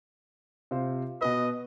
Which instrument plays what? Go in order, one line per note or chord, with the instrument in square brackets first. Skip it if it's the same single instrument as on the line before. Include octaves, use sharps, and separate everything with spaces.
[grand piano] C3 F4 C5
[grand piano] B2 F#4 B4 [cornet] D#5